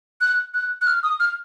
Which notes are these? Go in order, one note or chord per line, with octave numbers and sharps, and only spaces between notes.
F#6
F#6
F#6
F6
D#6
F6